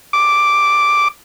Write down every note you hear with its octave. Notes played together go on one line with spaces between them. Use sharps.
D6